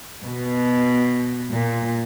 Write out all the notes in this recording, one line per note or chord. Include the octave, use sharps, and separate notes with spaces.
B2
A#2